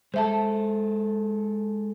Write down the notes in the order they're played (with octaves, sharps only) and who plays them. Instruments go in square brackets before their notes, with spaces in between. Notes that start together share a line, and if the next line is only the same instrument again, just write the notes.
[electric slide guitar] G#3 A4 [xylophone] C5 E5 A5